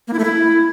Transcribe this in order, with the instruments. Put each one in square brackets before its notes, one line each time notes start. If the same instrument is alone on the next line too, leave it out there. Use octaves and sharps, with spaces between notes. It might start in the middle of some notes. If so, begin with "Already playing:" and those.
[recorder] A#3
E4
A3
E4